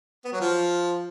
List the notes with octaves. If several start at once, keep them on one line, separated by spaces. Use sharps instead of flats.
B3
F#3
F3